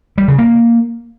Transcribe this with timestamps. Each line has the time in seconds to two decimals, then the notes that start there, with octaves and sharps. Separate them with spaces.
0.18 G3
0.28 C#3
0.38 A#3